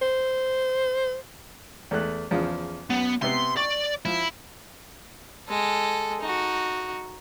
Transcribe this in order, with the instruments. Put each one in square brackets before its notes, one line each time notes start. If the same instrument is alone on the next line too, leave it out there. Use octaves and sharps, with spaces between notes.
[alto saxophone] C5
[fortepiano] E2 A3 F#6
E2 C#3 F3
[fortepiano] F#2 [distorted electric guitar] B3
[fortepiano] C3 B3 [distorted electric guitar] C6
[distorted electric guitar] D5 [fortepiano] C#6
[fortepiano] F3 [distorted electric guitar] E4
[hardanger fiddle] G#3 A4
D#4 F#4